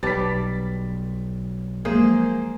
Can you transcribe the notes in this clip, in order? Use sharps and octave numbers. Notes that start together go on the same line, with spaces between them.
B1 G3 B4 D5 A5 B5 A6 B6
F3 F#3 G#3 A#3 G#4 C5